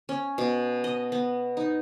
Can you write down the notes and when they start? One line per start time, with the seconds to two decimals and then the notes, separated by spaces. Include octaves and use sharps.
0.09 C#4
0.38 B2
0.84 D#5
1.12 B3
1.57 D#4